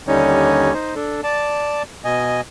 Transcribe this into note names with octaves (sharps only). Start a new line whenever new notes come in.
D#2 D3 G3 C#4 D#4 C#5
D#4 C5
D4 A4
D5 A5
B2 D#5 G#5